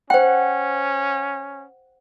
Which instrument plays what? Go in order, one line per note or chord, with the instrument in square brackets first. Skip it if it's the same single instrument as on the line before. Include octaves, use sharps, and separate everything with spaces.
[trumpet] C#4 [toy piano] C5 G5 [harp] F#5